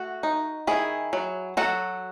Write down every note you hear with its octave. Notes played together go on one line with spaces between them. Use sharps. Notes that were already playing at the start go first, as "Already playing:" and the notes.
Already playing: A3 F#4
D#4
D#3 E4 G#4
F#3
F#3 F#4 A4